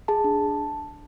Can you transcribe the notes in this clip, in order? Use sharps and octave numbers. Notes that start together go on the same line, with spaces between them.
G#4 A5
D4